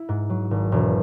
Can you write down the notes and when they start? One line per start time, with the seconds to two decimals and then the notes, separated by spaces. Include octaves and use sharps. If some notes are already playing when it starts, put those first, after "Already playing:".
Already playing: E4
0.09 G#2
0.30 F#3
0.51 G#1
0.72 E1